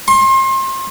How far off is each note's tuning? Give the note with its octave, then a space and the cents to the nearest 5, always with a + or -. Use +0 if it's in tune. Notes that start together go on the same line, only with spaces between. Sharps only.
C6 +35